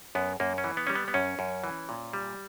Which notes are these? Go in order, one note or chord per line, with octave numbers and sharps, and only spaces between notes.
F#2 B3
F#2 A#3
C#4
E3
B3
G3 C#4
B3
B3
F#2 C#4
F#2
E3
A#2
G3